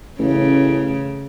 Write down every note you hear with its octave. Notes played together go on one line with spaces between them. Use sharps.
A1 C#3